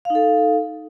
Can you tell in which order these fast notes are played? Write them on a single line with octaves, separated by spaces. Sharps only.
F5 D#4 A4